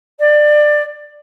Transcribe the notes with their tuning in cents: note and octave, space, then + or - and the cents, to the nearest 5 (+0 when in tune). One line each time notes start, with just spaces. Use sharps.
D5 +20